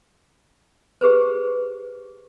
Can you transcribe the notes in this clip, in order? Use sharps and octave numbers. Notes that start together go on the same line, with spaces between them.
G4 G#4 B4 C5